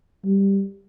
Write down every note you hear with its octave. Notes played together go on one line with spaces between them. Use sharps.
G3